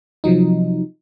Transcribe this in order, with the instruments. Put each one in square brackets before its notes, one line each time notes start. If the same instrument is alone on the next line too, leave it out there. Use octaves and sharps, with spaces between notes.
[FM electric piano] C3 F3 F#3 D#4